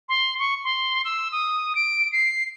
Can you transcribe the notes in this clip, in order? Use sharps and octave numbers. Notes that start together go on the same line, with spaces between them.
C6
C#6
C6
E6
D#6
D7
C7